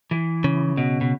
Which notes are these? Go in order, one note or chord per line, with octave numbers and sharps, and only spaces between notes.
E3
C#3
B2
B2